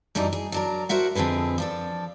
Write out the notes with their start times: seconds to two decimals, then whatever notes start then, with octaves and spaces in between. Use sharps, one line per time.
0.15 F#2 E3 G3 D4 D#4
0.33 G#4
0.52 F#3 D4 A#4
0.89 F#4 A#4 C5 E5 F#5
1.15 F2 D3 C4 G#4 B4
1.58 F3 D4 A4